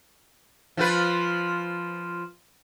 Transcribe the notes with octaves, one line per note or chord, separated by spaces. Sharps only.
F3 F4 B4